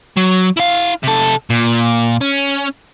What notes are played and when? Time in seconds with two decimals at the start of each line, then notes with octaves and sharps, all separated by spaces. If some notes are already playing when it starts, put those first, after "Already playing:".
0.17 F#3
0.57 E4 F5
1.03 C3 A4
1.50 A#2
2.21 C#4